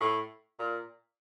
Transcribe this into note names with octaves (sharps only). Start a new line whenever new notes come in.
A2
A#2